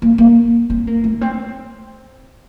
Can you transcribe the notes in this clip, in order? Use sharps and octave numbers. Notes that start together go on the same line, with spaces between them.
A#3
A#3
C4
A#3
A3
C4